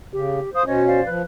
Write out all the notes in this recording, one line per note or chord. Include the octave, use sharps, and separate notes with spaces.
C#3 G4
C5 F5 D#6
B2 C#4 C5 C#5 D#5
C5 D5 F5
F3 B4